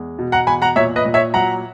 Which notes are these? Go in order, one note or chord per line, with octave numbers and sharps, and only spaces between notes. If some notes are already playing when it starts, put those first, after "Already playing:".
Already playing: E2 G#3
B2
F#5 A#5
E2 G#5 B5
F#5 A#5
A#2 C#5 E5
B4 D#5
A#2
C#5 E5
F#3 F#5 A#5